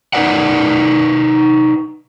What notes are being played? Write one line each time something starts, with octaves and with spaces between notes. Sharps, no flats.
D#4 A#4 B4 D5 F#5